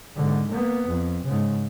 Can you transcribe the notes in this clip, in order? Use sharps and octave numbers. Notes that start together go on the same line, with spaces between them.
G#2 D3
A#3 B3
F2
G#2 C#3